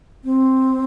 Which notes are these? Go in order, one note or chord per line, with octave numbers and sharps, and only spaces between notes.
C4